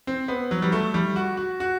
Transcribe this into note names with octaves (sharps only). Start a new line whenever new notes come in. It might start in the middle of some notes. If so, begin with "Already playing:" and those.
C4
B3
F#3
G3
A3
G3
F#4
F#4
F#4